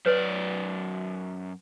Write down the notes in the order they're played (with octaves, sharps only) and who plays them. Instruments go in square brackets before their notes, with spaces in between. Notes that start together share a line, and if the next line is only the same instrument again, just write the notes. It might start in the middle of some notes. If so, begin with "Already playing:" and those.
[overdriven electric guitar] F#2 D5 [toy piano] B4 C#5